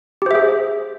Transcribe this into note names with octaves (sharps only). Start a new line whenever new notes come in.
G4 G#4 C5 E5